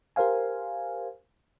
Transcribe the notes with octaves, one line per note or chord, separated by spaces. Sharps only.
G4 A#4 C5 F5 G#5